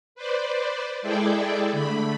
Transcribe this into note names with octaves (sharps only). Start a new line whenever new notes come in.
B4 C5 D5
G#3 E4 G#4 A4 D5 G5
D3 A3 B5